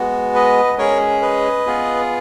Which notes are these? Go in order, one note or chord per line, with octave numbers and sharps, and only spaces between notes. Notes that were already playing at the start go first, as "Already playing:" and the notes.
Already playing: G#3 B3 F#4
B4 D#5
G#3 C#4 G#4 A#4 C#5
B4 D#5
B3 F4 G#4